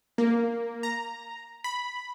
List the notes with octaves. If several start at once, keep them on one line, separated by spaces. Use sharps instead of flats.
A#3
A#5
B5